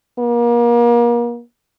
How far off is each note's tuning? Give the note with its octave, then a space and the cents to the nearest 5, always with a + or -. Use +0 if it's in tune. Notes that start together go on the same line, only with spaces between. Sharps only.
A#3 +35